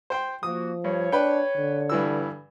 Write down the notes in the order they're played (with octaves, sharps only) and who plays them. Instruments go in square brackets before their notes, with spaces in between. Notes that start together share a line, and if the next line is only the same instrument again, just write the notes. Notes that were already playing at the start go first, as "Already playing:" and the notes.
[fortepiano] C5 G5 C6
[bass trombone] F3 [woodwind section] A#3 F#4 [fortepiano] D#6
[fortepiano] G2 [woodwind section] C#5
[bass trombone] D4 [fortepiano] B4 G5
[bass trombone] D3
[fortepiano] G2 E3 E6